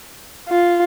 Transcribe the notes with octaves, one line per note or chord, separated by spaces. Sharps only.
F4